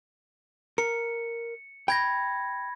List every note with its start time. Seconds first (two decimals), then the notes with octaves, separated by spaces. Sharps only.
0.78 A#4 C#7
1.88 G5 B5 G#6 A#6